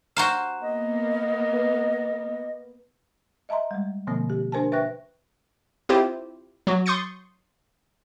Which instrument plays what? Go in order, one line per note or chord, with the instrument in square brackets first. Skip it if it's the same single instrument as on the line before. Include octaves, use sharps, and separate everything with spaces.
[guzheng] F#4 C5 F5 [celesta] A#5 E7
[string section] A#3 B3 [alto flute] D#5
[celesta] B4
[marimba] D#5 E5 A5 A#5 C6
G3 G#3
B2 D3 F3 A#3 C4
G4
D4 A#4 C5 G#5 A5
B4 E5 G5 C#6 F#6 A#6
[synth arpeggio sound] C4 E4 F4 G4 C5
F#3 F#4
C6 C#6 D#6 G6 A6 C#7